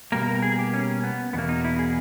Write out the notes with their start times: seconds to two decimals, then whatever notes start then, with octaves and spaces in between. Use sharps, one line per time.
0.12 B2 G3 A#3 A#4
0.28 A#4
0.42 G#4
0.59 G4
0.74 C#4
1.04 B3
1.33 E2 B2 A#3 B3
1.49 D#4
1.65 E4
1.79 G#4